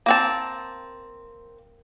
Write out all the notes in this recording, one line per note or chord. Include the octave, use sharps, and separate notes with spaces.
A#3 C4 A5